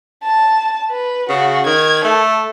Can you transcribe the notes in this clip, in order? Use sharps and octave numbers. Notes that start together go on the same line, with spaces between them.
A5
B4
C#3 F#4
D#3 G#6
A3 A4